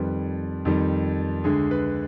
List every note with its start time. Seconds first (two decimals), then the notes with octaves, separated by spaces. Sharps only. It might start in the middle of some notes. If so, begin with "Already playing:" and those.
Already playing: F2 D#3 G3 B4
0.65 F2 D#3 G3
1.44 D2 D3 G#3 G#4
1.71 B4